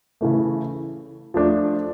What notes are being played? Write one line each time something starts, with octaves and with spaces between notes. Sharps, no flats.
C#3 E3 A3
F3 A3 D4